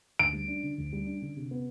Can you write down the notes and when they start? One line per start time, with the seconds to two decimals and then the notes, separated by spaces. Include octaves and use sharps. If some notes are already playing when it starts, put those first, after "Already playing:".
0.19 D2 D7
0.33 G3
0.48 D4
0.63 D3
0.78 D2
0.93 G3
1.06 D4
1.22 D3
1.36 C3
1.51 B3